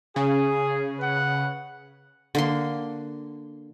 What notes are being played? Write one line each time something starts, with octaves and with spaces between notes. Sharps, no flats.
C#3 G#4
B4 F#5
D3 A#3 C6